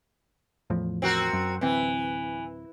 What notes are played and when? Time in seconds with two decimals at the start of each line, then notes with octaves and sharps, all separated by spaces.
0.70 E2 A2 F3
1.02 C4 F#4 A#4
1.33 F#2
1.61 D1 E3 C4